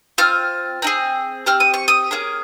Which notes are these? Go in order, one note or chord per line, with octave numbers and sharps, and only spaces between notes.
C4 F4 F6
C4 D#4 G#4
C4 G4 F6
D#6
C#6
D#6
A#3 C#4 G#4